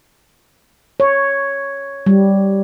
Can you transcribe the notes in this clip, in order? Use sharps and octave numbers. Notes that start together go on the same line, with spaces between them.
C#5
G3